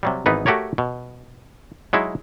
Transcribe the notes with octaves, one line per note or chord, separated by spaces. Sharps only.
C3 F#3 G3
G#1 E3 B3 D#4 B4
A3 F#4 G4 A#4 C#5
B2
F#3 G#3 D#4 E4